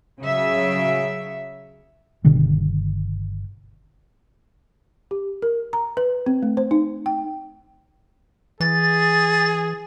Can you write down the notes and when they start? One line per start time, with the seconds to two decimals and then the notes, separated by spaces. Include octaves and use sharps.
0.21 C#3 F#3 E5
2.24 G1 B2 D3 D#3
5.11 G4
5.42 A#4
5.73 A#5
5.97 B4
6.26 C4
6.43 A3
6.57 C5
6.71 D#4
7.06 G5
8.60 E3 G#4 A6